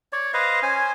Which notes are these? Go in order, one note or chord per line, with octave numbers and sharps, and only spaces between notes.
C#5 D5
B4 C5 D#5 F5
C#4 C5 G#5